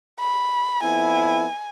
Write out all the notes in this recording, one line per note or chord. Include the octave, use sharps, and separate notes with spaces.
B5
F2 B3 E4 G#5